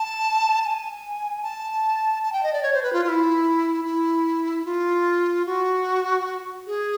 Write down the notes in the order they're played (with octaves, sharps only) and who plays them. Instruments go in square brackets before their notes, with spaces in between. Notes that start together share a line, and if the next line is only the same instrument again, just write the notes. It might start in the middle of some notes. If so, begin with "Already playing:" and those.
Already playing: [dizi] A5
A5
G#5
A5
A5
G5
D#5
D5
C#5
C5
B4
F4
F4
E4
E4
F4
F#4
G#4